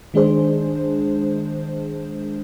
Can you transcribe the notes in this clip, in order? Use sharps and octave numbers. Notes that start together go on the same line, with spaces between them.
D#3 G#3 D4 G#4 C5